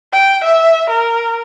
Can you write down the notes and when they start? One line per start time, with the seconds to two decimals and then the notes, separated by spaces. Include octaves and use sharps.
0.13 G5
0.44 E5
0.90 A#4